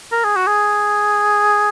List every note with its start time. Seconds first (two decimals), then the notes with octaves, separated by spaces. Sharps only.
0.12 A#4
0.24 G#4
0.36 F#4
0.47 G#4